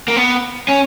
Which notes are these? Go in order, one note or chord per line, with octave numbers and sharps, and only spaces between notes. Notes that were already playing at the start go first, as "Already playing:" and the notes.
A#3
B3
C#4